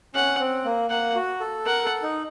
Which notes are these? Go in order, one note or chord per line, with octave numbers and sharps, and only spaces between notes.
C#4 F#5
C4
A#3
A#3 F#5
F#4
A4
A#4 F#5
A4
D#4